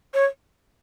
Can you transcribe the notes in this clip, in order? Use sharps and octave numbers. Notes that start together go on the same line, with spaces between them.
C#5